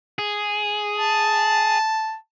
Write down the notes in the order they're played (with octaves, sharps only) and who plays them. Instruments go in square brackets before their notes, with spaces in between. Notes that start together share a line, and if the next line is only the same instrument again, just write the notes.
[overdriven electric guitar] G#4
[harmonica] A5